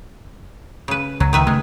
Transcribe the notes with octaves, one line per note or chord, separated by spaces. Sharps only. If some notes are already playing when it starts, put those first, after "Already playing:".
C#3 B4
C#2 F#3
D#3 B4 E5
C#3 G#3 A3